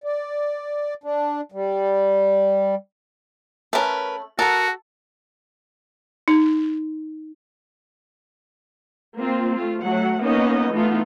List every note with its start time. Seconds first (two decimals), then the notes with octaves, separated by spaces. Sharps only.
0.04 D5
1.04 D4
1.52 G3
3.73 A3 C#4 A#4 B4
4.39 F#4 A4 A#4 F#5
6.28 D#4
9.18 A#3 C4 F4
9.55 A3 F4
9.84 F#3 A3 F#5
10.23 A#3 B3 C#4 D#4 D#5
10.72 E3 A3 B3 D#4 F4